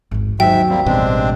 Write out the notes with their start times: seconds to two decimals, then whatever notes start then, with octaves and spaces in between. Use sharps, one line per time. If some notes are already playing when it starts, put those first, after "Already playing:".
0.11 G#1 E2
0.40 D#2 G#2 F#3 E5 G5
0.69 G3 A#3 C4
0.86 A1 G2 B2 G#3 C4 D4